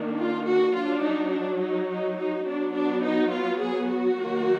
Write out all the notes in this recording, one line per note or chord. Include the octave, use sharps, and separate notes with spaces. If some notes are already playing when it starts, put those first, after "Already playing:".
Already playing: D#3 A#3 D4
F4
F#4
F#3 F4
D4
D#4
D4
D#4
D#4
D#4
F#3 B3 D4
D4
D#4
F4
G#4
F#4
D#3 F#3 A#3